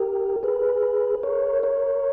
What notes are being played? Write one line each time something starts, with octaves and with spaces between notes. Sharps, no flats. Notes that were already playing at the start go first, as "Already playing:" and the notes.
Already playing: G4 A#4
G#4 B4
A#4 C#5
A#4 C#5